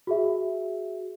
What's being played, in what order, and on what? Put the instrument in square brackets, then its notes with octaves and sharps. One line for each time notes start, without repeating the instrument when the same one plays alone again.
[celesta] F#4 G#4 E5